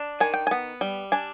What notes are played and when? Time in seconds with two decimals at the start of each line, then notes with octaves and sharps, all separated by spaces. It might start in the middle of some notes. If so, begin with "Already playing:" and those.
Already playing: D4
0.20 D#3 G#5
0.34 G5
0.47 G#5
0.51 B3
0.81 G3
1.12 D4 G#5